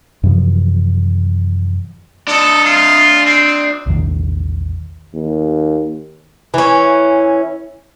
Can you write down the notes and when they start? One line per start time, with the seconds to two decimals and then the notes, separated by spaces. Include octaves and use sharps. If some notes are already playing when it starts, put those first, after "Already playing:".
0.23 F#2 C3 E3 F3
2.28 D4 A4 D#5
2.65 F4
3.25 C4
3.86 A#1 E2 D#3
5.15 D#2
6.54 E3 C#4